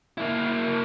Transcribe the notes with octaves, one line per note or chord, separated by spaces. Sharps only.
A#3 E4